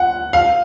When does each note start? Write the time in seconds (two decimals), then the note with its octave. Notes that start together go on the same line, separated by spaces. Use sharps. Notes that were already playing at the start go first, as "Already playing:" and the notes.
Already playing: F#5
0.33 F5